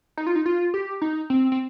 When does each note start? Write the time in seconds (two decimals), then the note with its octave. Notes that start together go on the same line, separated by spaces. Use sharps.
0.17 D#4
0.26 F4
0.36 D#4
0.46 F4
0.74 G4
1.02 D#4
1.30 C4
1.52 C4